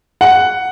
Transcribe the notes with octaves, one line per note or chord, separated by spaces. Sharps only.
F#5